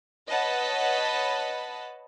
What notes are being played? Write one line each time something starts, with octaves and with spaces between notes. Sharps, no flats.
B4 C#5 D#5 F#5 A5 B5